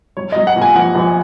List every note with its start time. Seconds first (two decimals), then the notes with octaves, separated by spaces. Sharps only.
0.17 F#3 C#5
0.32 F#3 D#5
0.47 F#5
0.56 A#2
0.62 G#5
0.76 A#1 F#5
0.95 A#1